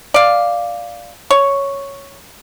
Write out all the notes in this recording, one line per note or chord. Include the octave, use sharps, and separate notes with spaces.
D5 F5
C#5